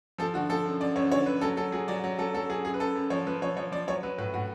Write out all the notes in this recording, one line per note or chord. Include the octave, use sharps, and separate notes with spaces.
F3 A4
D3 F#4
F3 A4
F#2
F#2 D5
F#2 C#5
D3 C#5
F#2 B4
F#3 A4
F#3 A4
F#3 G#4
F#3 D5
F#3
F#3 A4
F#3 A4
F#3 G#4
F#2 G#4
B4
F#2 A4
F#2
F3 C#5
F3 B4
F3 C#5
F3 C#5
F3 D5
F#3 C#5
F#3 B4
A2 B4
A2 F#4